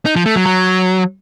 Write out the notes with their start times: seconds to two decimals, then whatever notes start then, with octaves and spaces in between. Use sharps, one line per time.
0.06 D#4
0.16 F3
0.26 A3
0.36 F#3
0.46 F#3